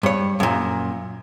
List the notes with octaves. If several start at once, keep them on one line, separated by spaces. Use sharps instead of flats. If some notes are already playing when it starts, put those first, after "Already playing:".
G2 C#5
F#2 A#2